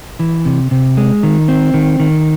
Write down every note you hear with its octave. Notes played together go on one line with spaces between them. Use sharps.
E3
C3
C3
G#3
D#3
C4
D#3
D#3